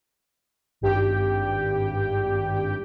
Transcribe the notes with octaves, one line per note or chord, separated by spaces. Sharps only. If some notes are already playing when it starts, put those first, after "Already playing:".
G#1 G2 G4 G5